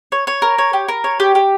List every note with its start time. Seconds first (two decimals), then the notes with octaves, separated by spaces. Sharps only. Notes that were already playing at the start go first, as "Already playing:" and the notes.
0.12 C#5
0.27 C#5
0.42 A#4
0.58 C#5
0.73 G4
0.88 A#4
1.04 C#5
1.20 G4
1.35 G4